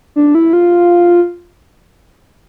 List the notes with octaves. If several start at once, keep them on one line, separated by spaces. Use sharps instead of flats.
D4
E4
F4